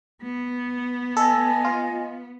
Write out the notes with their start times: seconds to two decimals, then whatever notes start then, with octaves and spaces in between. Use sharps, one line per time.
0.22 B3
1.17 A4 D#5 G#5
1.64 F4